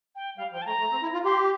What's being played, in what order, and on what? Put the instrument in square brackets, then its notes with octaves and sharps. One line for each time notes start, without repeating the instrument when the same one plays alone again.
[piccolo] G5
[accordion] G3 [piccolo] F5
[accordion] F3 [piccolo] G5
[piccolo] A5
[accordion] A3 [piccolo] A#5
[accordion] A3
C4
E4
F4
[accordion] G4 [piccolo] C6